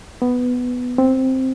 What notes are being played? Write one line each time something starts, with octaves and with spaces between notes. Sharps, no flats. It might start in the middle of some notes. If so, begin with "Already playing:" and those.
B3
C4